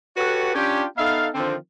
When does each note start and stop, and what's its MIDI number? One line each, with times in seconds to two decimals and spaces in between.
0.17 0.52 66
0.17 0.52 67
0.17 0.52 69
0.17 0.52 71
0.17 0.52 73
0.17 0.52 78
0.54 0.84 61
0.54 0.84 62
0.54 0.84 65
0.54 0.84 67
0.96 1.27 59
0.96 1.27 63
0.96 1.27 69
0.96 1.27 76
0.96 1.27 77
1.34 1.55 50
1.34 1.55 51
1.34 1.55 53
1.34 1.55 60